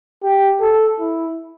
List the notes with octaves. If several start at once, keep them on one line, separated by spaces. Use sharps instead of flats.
G4
A4
E4